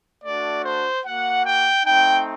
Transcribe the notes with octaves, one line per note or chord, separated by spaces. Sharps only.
A3 D4 F#4 D5
C5
A#3 F#4 F#5
G5
A3 C4 D#4 G5